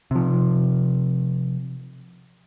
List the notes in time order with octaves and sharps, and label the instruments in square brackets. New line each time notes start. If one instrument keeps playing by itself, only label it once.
[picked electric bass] C3 F3